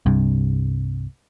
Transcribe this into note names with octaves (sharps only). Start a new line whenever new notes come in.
C2 G2 C3